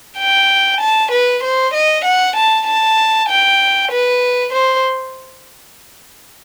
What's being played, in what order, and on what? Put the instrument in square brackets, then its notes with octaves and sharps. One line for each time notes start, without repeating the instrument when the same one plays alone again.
[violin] G5
A5
B4
C5
D#5
F#5
A5
A5
G5
B4
C5